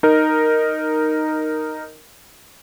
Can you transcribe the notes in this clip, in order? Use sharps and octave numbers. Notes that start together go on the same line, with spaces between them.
D#4 A#4